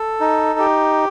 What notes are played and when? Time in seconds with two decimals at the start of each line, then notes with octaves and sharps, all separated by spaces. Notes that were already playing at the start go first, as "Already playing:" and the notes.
Already playing: A4
0.21 D#4
0.59 G4